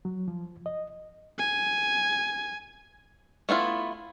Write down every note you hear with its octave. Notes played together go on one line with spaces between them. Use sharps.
F#3
F3
D#5
G#5
A3 B3 E4 F4